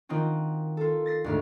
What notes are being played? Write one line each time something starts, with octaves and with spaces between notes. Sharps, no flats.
D#3 C4 D#4 F4 F#4
F4 A4
A6 A#6 C7
D2 G#2 F6